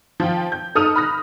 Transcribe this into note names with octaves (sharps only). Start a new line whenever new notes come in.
F3 F4 G5
G6
G#2 A4 D#6 F6 D#7 F7
B5 D#6 F6 F#6 A#6